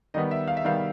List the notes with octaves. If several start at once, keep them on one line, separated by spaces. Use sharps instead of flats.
D#3 G3 B3 D#5
E5
F5
E5
D#3 G3 B3 F5